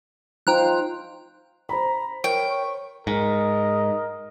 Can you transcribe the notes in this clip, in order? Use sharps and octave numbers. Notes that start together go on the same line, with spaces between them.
D#4 F4 C5 G5 A#5 F#6
C5 A#5 B5
A#4 C#5 G5
C#6
G#2 A#4 D#5